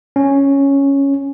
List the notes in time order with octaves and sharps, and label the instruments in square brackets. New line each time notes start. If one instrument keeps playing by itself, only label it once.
[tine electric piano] C#4